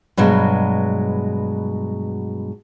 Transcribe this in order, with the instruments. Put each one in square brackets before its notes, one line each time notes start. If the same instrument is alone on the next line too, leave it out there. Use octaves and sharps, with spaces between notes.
[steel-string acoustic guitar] G2 B2 F#3 G#3